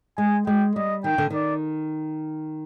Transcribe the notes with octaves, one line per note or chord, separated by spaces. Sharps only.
G#3 G#5
G#3 G5
G3 D#5
D#3 G5
D3
D#3 D5